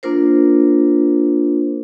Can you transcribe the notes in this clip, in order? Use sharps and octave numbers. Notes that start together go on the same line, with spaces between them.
A#3 D4 F4 A#4 C5